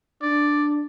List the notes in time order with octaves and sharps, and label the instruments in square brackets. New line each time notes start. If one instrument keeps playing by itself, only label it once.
[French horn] D4 [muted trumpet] D5